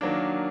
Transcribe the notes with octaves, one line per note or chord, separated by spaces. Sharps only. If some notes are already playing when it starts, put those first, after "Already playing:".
D#3 F#3 A#3 D4